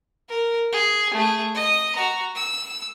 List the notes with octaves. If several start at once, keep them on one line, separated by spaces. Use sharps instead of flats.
A#4
G#4
A3 G#4
D#5 D#6
F#4 A#5
E6